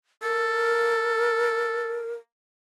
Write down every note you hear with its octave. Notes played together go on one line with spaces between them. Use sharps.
A4 A#4